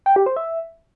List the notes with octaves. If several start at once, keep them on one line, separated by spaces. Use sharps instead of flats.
G5
G4
C5
E5